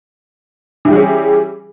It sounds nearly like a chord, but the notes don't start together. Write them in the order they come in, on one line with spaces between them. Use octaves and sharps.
E3 G4 G3 G#4 C#4